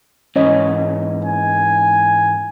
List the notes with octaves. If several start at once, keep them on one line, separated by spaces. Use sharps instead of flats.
G#2 E3 C#4 C#5 D#5
G#5